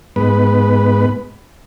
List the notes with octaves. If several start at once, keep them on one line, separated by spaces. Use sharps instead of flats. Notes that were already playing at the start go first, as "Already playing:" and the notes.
G#2 B3 B4